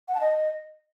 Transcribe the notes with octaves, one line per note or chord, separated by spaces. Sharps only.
F#5
A5
D#5